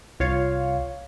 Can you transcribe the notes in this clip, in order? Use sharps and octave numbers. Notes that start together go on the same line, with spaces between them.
C2 F4 C#5 F5